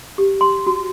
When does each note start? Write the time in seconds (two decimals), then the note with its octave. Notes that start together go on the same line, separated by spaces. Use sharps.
0.18 G4
0.41 C6
0.67 F#4